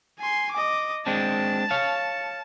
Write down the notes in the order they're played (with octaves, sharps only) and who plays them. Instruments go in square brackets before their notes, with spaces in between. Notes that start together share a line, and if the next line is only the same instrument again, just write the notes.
[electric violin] G#5 C6
D#5 D6
[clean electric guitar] G#3 C4 D4 [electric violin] A5
[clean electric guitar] C#5 F5